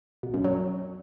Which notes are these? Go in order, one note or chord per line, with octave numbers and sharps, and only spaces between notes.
B2
F#2
F#3